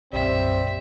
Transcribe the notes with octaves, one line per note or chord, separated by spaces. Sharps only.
B1 F#2 A#2 G3 C4 E5